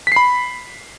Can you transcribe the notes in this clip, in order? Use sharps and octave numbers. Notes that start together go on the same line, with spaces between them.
B5 B6 C7